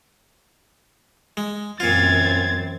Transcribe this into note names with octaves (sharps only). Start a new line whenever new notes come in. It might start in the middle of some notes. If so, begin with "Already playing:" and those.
G#3
F#2 A#2 E3 C4 F4 G#6 A6